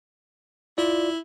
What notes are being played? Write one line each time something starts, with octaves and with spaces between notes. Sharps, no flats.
E4 F4 D5